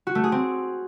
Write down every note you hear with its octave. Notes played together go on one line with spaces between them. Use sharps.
F#4
A3
G#4
C4